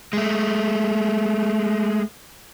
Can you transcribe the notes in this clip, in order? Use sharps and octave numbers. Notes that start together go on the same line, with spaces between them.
G#3 A3